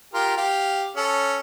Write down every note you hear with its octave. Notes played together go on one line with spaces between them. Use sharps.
F4 G4 A#4
G4 F5
C#4 A4